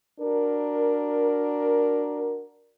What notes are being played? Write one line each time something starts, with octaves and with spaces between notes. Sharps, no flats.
D4 F#4 A#4